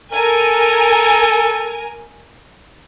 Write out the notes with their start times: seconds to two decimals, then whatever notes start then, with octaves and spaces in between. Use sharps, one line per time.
0.13 A4 A#4 G#5